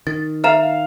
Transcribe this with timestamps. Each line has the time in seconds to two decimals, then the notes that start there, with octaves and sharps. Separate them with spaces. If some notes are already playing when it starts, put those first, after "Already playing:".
0.07 D#3 A6
0.44 E5 F5 A#5 F6